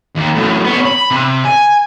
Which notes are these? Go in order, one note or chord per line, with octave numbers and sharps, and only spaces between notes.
D#2
F#2 A2
B3 C#5
B5
C3
G#5